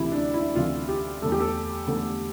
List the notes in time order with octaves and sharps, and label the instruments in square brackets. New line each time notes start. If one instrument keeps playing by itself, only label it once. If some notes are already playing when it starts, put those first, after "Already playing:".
Already playing: [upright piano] D2 C3 E3 E4 G4
D4
E4
D2 C3 E3 F4
G4
E2 D3 A3 A4
G4
A4
E2 D3 A3